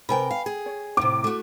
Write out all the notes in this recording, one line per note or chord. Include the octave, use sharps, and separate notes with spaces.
C3 A#4 B4 G5 G#5 B5
F5
G#4
C#5
A2 C3 E4 C5 F5 D6
A3 F#4